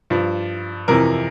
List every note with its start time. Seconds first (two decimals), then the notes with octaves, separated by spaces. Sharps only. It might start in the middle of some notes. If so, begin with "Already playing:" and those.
0.10 G2 F3
0.88 F2 C3 E3 A#4